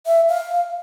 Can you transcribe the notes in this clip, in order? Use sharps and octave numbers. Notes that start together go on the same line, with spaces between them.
E5
F5